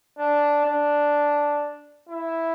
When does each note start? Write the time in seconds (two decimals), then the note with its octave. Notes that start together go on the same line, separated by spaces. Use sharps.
0.18 D4
0.66 D4
2.09 E4